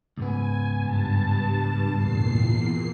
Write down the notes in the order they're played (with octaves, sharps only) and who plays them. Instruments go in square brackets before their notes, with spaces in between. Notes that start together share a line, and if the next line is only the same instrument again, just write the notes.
[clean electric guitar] C#2 G#2 B3 [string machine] G#5
[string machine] G2 A5
E2 A#2 C7